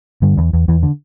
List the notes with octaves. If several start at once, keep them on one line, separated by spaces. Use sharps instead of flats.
G2 D3 G3
E2
E2
E2 E3
D3